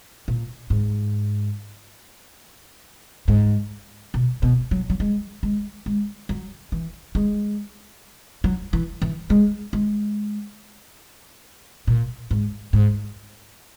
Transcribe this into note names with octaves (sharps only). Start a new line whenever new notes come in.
A#2
G#2
G#2
B2
B2
F#3
F#3
G#3
G#3
G#3
F#3
E3
G#3
F#3
E3
E3
G#3
G#3
A#2
G#2
G#2